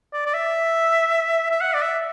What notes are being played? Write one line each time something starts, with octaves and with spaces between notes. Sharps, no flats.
D5
D5
E5
E5
F#5
D5
E5